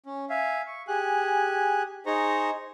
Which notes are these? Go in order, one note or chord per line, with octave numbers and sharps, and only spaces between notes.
C#4
E5 F5 G#5
C#6
G4 G#4 G#5 F#6
D#4 G#4 C5 A#5 C#6